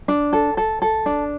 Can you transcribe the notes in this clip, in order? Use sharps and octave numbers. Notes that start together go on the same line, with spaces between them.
D4
A4
A4
A4
D4